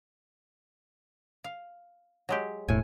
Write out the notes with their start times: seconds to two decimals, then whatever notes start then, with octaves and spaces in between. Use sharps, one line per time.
1.44 F5
2.29 F#3 G#3 G4
2.68 E1 A2 G#5